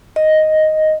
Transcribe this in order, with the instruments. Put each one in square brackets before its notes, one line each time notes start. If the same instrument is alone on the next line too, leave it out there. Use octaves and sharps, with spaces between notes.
[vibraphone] D#5